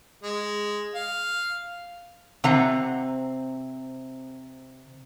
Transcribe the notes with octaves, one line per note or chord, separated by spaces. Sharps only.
G#3
F5
C3 C4 F#5 A#5